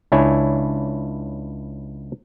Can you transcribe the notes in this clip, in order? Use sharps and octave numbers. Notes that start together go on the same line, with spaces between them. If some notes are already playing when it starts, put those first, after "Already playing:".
C#2 D4 E4 C#5 G#5